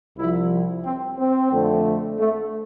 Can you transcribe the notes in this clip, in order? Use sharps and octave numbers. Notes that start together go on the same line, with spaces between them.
C2 C3 F3 E4
C4
C4
F2 D3 A3
A3